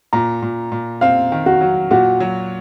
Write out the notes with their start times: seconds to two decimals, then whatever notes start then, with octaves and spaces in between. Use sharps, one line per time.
0.13 A#2 A#5
0.42 A#2
0.72 A#2
1.01 C4 F5
1.32 D#3
1.46 F#4
1.61 F#3
1.91 A#2 F#4
2.20 F#3